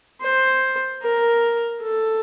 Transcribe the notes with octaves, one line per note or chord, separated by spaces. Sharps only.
C5
A#4
A4